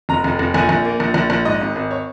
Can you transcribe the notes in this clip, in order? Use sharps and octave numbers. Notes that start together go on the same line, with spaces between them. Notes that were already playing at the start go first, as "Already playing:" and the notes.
F1 A#5
F1
F1
A#1 G#5
A#1
A#3
A#1
A#1
A#1
G#2 D#5
G#1
G#1
C#5